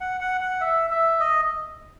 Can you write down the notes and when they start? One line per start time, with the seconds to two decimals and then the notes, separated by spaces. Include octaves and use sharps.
0.01 F#5
0.21 F#5
0.41 F#5
0.61 E5
0.90 E5
1.20 D#5